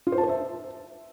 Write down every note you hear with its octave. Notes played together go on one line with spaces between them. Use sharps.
F4
C5
A5
C5
E5